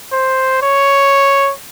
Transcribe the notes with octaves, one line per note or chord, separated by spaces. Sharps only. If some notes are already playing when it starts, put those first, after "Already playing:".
C5
C#5